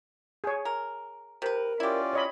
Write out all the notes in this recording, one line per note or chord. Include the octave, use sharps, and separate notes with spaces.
G#4 C#5
A#4
C3 A#4 B4
C#4 E4 F4 G4 D5
C#5 D#5 B5